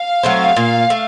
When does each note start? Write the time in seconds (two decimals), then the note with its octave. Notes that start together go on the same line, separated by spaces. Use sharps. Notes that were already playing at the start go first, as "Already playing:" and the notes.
Already playing: F5
0.23 F#3 A3 C4
0.56 A#2
0.90 A3